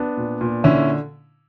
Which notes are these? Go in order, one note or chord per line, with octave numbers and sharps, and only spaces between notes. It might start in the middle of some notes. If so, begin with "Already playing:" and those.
Already playing: B3 D4
A#2
A#2
D3 C#4 E4